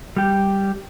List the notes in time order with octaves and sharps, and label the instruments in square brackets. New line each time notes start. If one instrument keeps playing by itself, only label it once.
[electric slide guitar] G3 G4